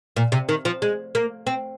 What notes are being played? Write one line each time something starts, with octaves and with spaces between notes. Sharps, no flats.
A#2
C3
D#3
F3
G#3
A#3
C4